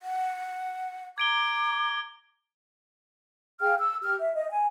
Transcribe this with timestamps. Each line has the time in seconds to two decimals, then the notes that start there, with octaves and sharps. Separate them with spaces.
0.02 F#5
1.18 A#5 D6 G#6 D7 G7
3.60 G#4 F5 G5 F6
3.79 E6
4.03 G4 F6
4.20 E5
4.36 D#5
4.50 G#5